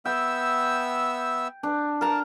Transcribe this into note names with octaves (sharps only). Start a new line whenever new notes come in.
B3 E5 G5 E6
D4
A#4 G5 A5 A#5